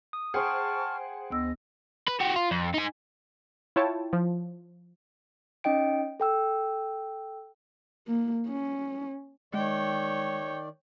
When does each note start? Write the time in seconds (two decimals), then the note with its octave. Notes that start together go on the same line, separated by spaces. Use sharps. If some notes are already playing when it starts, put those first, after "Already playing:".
0.13 D#6
0.34 G#4 C5 F#5 G5 A5 C6 C#6 F6
1.31 D2 B3 D#5 E6
2.08 B4
2.20 F#4 G4
2.36 F4
2.51 F2
2.74 D#4 G#5
3.76 E4 F4 C#5 G5 A5
4.13 F3
5.64 C#4 D#4 D#5 G5 D7
6.20 A4 G5 E6
8.08 A#3
8.49 C#4
9.54 D#3 G#3 C#5 D5 G5